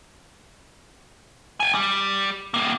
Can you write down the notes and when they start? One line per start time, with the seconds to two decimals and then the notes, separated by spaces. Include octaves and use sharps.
1.60 G5 G#5
1.75 G3
2.54 A2 A#3